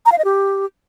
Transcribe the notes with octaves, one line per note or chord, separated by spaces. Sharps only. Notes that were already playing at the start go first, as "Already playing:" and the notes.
A#5
F5
D#5
G4